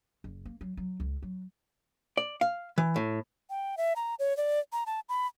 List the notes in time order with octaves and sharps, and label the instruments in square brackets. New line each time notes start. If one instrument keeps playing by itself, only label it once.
[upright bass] F#1
A#3
F#3
F#3
C#2
F#3
[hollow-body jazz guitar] D5
F5
E3
A2
[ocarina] G5
E5
A#5
C#5
D5
A#5
A5
B5